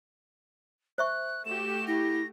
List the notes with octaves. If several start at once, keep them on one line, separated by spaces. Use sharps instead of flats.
C5 E5 C#6 F#6
A3 F#4 G4 E7
E4 A#6